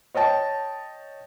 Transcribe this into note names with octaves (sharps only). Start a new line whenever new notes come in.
C#5 D#5 G5 A5